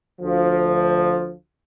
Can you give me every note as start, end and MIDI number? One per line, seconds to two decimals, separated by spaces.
0.21 1.33 38
0.21 1.33 53